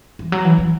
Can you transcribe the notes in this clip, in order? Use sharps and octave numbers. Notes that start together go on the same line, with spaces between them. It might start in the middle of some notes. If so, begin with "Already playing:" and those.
E3
F#3
E3
E3